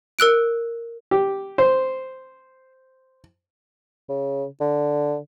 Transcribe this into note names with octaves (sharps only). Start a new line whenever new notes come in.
A#4 E6 F#6 D7
G4
C5
C#3
D3